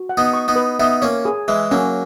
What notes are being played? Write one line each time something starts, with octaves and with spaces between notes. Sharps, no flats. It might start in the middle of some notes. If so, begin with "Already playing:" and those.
Already playing: F#4
F#5
B3 D#4
C#6
B3 D#4
B4
B3 D#4 E5
A#3 C#4 C#5
G#4
E3 G#3 E5
F#3 A#3 C#4